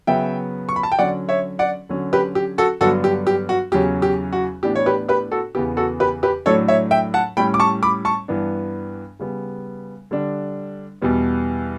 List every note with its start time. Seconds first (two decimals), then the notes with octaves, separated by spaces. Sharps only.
0.07 C#3 F#3 B3 E5 G5
0.69 C#6
0.76 B5
0.83 A5
0.92 G5
0.98 D3 F#3 C#4 D5 F#5
1.29 C#5 E5
1.59 D5 F#5
1.89 D3 F#3 C#4
2.13 G4 B4
2.35 G4
2.58 F#4 A4
2.81 G2 D3 F#3 B3 D4 F#4 A4
3.04 G4
3.27 G4
3.49 F#4
3.72 E2 C#3 F#3 C#4 G4
4.02 G4
4.33 F#4
4.63 A2 E3 B3 D4 G4
4.75 C#5
4.86 G4 B4
5.09 G4 B4
5.32 F#4 A4
5.55 E2 C#3 E3 B3 G4
5.77 F#4 A4
6.00 G4 B4
6.23 G4 B4
6.46 A2 F#3 A3 D4 A4 C#5
6.68 C#5 E5
6.91 E5 G5
7.14 F#5 A5
7.37 A2 G3 C#4 G5 B5
7.54 D6
7.60 A5 C#6
7.83 B5 D6
8.05 A5 C#6
8.28 G2 E3 B3 D4
9.19 C#3 G3 B3
10.11 D3 G3 D4
11.02 E2 B2 G3 B3